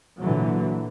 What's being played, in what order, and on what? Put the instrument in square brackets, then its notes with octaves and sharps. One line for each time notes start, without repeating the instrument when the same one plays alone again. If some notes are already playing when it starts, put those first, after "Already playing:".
[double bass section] A#2 D3 E3 F#3